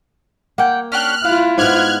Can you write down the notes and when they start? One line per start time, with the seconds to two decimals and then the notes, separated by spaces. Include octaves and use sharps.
0.58 A#3 F#5 G5
0.92 C#4 D4 G4 F6 F#6
1.25 E4 F4 F5
1.58 G#2 B3 F6 F#6 G#6